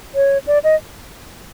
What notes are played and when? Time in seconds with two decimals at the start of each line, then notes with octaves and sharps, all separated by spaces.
0.15 C#5
0.47 D5
0.64 D#5